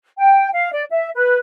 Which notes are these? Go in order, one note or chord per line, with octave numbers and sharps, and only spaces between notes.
G5
F5
D5
E5
B4